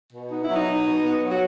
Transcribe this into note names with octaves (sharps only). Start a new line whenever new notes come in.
B2
B3 D#4
E4
F#3
D#4
B2
B2
B3
F#3
F#4